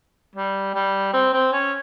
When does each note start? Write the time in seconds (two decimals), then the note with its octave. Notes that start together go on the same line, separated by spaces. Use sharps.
0.36 G3
0.75 G3
1.13 C4
1.33 C4
1.52 C#4